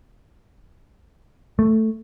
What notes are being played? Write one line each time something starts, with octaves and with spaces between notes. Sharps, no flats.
A3